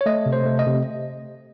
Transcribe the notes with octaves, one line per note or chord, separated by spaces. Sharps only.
C#5
A3 D#5
C3
C5
A3
D#5
C3